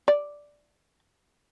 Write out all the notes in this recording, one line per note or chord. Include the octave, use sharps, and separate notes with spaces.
D5